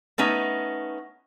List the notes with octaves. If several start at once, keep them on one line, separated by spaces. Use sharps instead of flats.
A3 B3 C#4 D#4